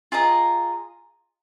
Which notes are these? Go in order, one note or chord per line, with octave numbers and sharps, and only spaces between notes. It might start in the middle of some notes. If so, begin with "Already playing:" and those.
F4 G#4 D#5 A#5